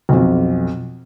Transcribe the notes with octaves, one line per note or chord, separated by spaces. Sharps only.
B1 F2